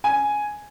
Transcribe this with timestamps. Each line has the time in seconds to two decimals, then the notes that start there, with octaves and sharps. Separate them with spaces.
0.04 G#5